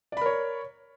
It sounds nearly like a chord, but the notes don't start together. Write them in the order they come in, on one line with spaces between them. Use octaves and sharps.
D5 B5 A#4 C#5